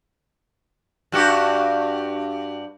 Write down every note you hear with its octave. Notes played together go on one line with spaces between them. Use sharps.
G2 F#4 G4